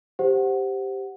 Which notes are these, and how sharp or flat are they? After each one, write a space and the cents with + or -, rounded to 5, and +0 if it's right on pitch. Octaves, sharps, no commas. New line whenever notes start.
G4 +0 C5 +0 F#5 +0